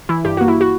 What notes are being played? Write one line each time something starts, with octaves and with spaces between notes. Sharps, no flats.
E3 E4
G2 G4
A#3 F#4
E4
F#4